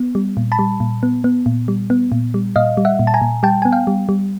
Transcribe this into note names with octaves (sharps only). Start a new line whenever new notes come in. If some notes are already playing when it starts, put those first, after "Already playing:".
Already playing: B3
G3
A#2
A5 B5
G3
A#2
B3
B3
A#2
G3
B3
A#2
G3
A#2 D#5 F5
G3
E5 F#5
A#2
A5
G#5 A#5
A#2
G3 G5 A5
B3 G#5
F5 G5
G3
G3